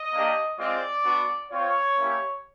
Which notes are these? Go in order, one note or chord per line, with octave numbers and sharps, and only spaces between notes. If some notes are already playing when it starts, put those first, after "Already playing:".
Already playing: D#5
A#3 D4 G4
G#3 C4 F4 D5
B3 D4 F#4
C4 F4 C#5
A#3 C#4 E4 G4